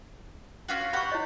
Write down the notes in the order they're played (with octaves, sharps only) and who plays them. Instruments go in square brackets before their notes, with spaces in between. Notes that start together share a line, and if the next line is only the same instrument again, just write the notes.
[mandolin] C#4 F4 F#4
[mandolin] G4 F#5 [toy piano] B5 C#6
[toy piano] E4 C#5 D#5